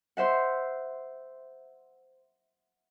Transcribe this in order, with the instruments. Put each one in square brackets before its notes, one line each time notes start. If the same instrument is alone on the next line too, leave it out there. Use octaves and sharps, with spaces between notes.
[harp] C5 E5 F#5